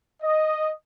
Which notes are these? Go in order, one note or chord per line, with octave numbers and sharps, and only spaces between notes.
D#5